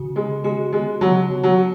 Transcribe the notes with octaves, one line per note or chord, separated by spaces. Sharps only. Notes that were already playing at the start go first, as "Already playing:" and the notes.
Already playing: C#3 F#4
C#3 G#3
G#3 F#4
G#3 B3
C#3 F#3
C#3
F#3
F#4